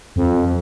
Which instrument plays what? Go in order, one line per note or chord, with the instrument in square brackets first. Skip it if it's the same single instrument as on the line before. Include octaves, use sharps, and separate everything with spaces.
[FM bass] F2